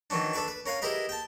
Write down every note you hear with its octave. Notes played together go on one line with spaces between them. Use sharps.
D#3 E3 F#3 C#4 D4
D4 A4 B4 D5 C#6
B4
C#4 A#4 F5 F#5 G#5
E4 G4 G#4 A#4 B4 D#5
G5 A5